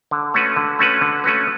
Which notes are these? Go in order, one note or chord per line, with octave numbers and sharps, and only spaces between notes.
D3
A3 C#4 F#4 B4
D3
A3 C#4 F#4 B4
D3
A3 C#4 F#4 B4